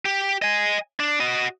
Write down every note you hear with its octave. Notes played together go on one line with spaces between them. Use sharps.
G4
D#5 G#5
D4
F#4 D#5